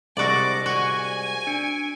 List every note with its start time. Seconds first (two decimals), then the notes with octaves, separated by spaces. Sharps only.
0.17 C2 C3 G#3 F#4 G#4 D5 D6 A#6
0.66 F#4 G#5
1.47 D4 C#7 D7